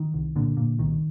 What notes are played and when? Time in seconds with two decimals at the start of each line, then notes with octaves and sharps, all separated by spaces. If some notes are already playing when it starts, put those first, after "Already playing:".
Already playing: D#3
0.14 C2
0.36 A#2 D3
0.57 A#2
0.79 C2 D#3